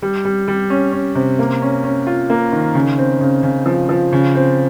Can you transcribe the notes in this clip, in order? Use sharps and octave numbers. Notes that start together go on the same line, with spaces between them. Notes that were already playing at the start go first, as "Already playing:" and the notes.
G3
G3
G3
C#4
C#4
C3
A#3
C#4
C#4
F4
A#3
D#3
C#3
C4
C#3
C#3
F3
F3
C#3
C4